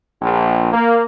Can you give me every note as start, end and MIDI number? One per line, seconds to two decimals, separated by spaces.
0.21 0.72 34
0.73 1.03 58